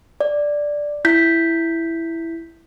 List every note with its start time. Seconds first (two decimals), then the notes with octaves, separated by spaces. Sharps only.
0.21 D5
1.05 E4 G6 B6